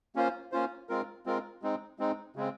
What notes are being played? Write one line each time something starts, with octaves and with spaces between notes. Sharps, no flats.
A#3 C#4 F4 C5
A#3 C#4 F4 C5
G#3 C4 F4 A#4
G#3 C4 F4 A#4
G#3 C4 D#4
G#3 C4 D#4
C#3 G#3 C4